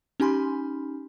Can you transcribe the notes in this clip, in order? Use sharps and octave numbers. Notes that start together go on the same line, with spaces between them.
C#4 D#4 G4 G#5 B5 C6